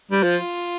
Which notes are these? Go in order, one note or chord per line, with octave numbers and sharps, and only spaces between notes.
G3
F3 F4